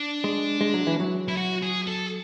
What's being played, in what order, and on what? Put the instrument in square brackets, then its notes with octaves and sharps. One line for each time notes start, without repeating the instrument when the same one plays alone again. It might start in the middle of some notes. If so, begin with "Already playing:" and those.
Already playing: [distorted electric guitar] D4
[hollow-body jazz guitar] G#3
G#3
F#3
E3
F#3
[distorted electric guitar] E4
F#4
G#4
A4